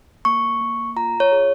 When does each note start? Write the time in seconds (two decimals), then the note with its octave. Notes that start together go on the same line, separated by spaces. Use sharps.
0.25 A#3 C#6
0.61 A#3
0.96 F4 A#5
1.20 C#5
1.32 G#4